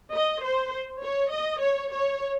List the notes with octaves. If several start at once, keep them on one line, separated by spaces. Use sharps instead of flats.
D#5
C5
C#5
D#5
C#5
C#5